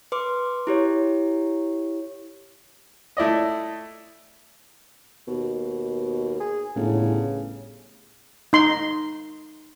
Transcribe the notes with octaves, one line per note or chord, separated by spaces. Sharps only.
B4 C6 D6
E4 G4 C#5
A3 E4 D5 D#5
D#2 B2
G#4
G1 A2 C#3
D#4 C6